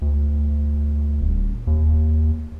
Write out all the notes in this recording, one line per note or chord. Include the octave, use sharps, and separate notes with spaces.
D2
D#1
D#2